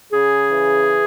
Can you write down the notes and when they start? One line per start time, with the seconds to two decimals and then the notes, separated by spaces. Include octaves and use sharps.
0.12 C#3 G#4
0.51 E3